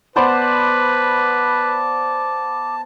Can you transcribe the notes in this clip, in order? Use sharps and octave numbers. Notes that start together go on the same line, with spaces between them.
B3 B4 C5 D5 A5 D6